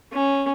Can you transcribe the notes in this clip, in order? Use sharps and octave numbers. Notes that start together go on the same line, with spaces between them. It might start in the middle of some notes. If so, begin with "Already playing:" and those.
C#4